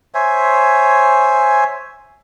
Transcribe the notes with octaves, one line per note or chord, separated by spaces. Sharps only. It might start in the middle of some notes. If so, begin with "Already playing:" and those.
C5 C#5 E5 G#5